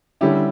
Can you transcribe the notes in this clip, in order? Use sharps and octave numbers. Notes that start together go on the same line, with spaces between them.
D3 G3 C#4 E4 G4